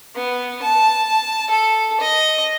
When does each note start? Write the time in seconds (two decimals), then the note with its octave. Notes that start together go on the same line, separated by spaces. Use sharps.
0.15 B3
0.62 A5
1.50 A4
2.00 D#5